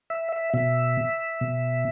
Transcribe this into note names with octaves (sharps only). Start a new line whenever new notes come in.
E5
E5
B2 E5
B2